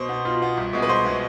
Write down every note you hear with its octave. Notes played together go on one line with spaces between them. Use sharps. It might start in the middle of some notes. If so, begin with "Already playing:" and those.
Already playing: B2 C5
B3
B2 F4
B3
C2
B2 G#3 B3
B4
C2 C5
B2 G#3 B3